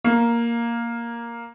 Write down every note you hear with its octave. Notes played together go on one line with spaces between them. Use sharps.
A#3